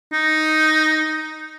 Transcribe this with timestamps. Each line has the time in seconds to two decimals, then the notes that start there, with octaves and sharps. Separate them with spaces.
0.13 D#4